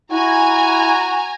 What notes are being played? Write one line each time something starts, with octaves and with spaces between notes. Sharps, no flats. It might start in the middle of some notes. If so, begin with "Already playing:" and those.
E4 F#4 G#5 A#5